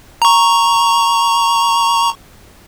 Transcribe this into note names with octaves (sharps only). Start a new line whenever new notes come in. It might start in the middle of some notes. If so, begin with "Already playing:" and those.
A#5 C#6